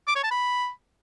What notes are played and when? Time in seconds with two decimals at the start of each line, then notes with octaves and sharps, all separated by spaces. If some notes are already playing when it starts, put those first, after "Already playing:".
0.08 D6
0.16 C#5
0.23 A5
0.31 B5